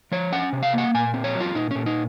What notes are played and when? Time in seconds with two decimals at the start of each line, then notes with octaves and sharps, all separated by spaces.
0.12 F3 C#5
0.32 C#4 F#5
0.53 C3
0.63 F5
0.74 A#3 F#5
0.94 A#2 G#5
1.14 C4
1.24 C#5
1.35 F#3
1.40 F4
1.55 A#2 D#4
1.71 A#2 C#4
1.86 D#4